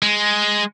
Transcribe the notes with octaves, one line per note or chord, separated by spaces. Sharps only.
G#3